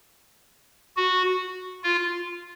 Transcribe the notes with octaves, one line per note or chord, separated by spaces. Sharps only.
F#4
F4